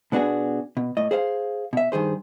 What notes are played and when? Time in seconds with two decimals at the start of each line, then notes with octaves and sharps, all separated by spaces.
0.12 B2 B3 D4 F#4 G#4
0.77 B2
0.97 A2 D#5
1.11 G#4 C5 E5 F5
1.73 B2 E5
1.92 G2 D#3 G#4 C5